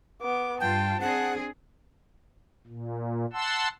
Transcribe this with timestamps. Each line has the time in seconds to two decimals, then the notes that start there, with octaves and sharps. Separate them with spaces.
0.22 B3 D6
0.60 G2 F4 G5 A5
1.00 C4 D4 G#4 F#5
2.67 A#2
3.33 F#5 A5 C6 E6